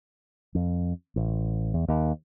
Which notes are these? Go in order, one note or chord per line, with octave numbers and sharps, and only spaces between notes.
F2
A1
E2
D#2